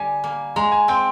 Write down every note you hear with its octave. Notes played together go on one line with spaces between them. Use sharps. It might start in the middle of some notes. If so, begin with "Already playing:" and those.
Already playing: D3 G3 G#5
A#3
G#3 A#5
G#5
C4 G5